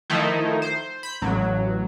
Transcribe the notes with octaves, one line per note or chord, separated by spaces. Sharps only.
D#3 F3 A3 D#4 E4
C5
B5 G6
A1 F#3